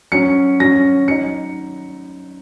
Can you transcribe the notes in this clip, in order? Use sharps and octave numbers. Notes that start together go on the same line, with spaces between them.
F#3 C#4 C#7
F#3 C#4 A#6
F#3 D#4 C#7